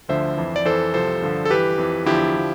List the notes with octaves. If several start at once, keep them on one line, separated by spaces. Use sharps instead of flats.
D2 D3 F3 C5 E5
F2 E3
D5
F2 E3 A4 C5
C2 C3 F3 A4 C5
G2 D3 F3
A4
G2 E3 G4 B4
F2 E3
E2 D3 F3 E4 G4
D3 F3